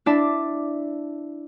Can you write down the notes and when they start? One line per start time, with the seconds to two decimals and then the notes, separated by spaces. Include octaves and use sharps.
0.06 D4 E4 D5 E5 A5